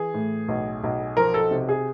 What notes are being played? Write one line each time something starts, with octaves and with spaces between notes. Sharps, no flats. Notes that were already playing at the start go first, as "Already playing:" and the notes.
Already playing: E3 G#4
A2
B1
B1
F3 A#4
A4
C3
G#4